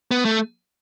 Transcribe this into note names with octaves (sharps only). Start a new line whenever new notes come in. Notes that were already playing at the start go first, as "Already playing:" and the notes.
B3
A3